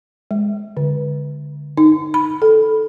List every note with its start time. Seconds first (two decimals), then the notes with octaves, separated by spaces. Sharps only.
0.31 G#3
0.77 D3
1.77 D#4
2.14 B5
2.42 A4